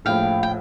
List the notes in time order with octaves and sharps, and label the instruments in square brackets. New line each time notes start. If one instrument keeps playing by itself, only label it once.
[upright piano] A#1 A2 F3 [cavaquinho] F5 G5
[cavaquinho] G5